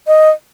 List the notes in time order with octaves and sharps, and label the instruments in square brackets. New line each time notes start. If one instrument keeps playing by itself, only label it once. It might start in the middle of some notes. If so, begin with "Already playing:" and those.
[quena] D#5